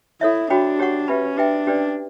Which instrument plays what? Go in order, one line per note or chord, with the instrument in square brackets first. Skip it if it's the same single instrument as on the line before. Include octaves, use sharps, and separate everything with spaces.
[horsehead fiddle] E4 [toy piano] A4 C#5 E5
[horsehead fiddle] D4 [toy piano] F#4 C#5 G5 B5
[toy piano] G4 C#5 F#5 C#6
[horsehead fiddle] C#4 [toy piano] G4 B4 E5 B5
[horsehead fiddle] D4 [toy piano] G4 B4 E5 G5
[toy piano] C#4 G4 B4 D5